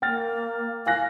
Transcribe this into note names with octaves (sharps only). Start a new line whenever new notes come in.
A#3 G5 F6 A6
F5 G#5 F#6 A#6